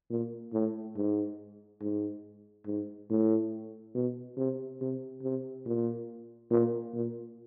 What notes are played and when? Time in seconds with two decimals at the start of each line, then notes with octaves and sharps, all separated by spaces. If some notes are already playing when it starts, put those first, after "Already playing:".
0.10 A#2
0.53 A2
0.96 G#2
1.81 G#2
2.66 G#2
3.10 A2
3.95 B2
4.37 C3
4.81 C3
5.23 C3
5.66 A#2
6.51 A#2
6.94 A#2